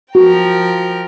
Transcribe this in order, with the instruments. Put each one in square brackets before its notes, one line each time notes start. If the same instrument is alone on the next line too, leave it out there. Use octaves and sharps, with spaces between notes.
[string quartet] F3 A#4 G5 [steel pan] F#4